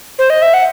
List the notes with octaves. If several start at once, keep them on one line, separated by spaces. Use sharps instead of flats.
C5
D#5
E5
F#5